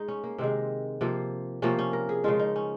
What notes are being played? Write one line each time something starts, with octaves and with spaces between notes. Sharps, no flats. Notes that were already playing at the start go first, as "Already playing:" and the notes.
Already playing: G#3 D#4
C#4
A#3
C3 D#3 G#3 C4
C3 F3 A#3
C3 F3 A#3 C#4
C#4
A#4
G#4
C#3 F3 G#3 F4
D#4
C#4